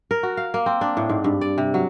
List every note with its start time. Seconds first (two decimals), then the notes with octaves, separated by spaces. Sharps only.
0.11 A#4
0.23 F#4
0.37 F5
0.54 A#3
0.66 C4
0.81 D4
0.97 A2
1.09 G#2
1.24 G2
1.41 D5
1.58 C3
1.74 F#3